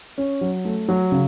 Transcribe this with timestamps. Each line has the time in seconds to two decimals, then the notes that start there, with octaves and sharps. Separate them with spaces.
0.18 C#4
0.41 F#3
0.65 A3
0.88 F#3
1.12 C#3